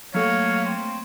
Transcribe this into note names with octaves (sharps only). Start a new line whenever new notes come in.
F#3 A3 A#3 A4 C#5 F5 F#5
C4